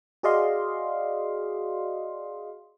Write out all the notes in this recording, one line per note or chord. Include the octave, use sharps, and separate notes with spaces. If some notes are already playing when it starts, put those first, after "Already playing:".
F#4 G#4 D5 D#5 F5 C6